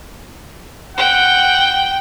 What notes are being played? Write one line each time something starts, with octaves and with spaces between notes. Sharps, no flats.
F#5 G5